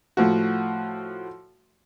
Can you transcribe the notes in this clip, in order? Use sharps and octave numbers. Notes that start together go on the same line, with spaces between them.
A2 F3 F#4